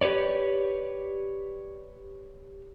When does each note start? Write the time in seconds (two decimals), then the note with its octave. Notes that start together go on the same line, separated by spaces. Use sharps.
0.01 G4 B4 C#5 D5